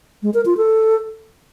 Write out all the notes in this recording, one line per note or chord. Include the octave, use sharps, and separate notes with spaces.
G#3
A#4
F4
A4